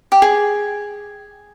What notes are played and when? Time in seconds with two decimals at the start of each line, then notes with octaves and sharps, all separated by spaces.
0.12 G4
0.22 G#4